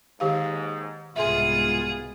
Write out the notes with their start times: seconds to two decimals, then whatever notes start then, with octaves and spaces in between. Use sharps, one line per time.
0.20 D#2 G#2 D#3 G4 F5
1.16 C2 G#2 B2 B3 F4 G#4 E5 C6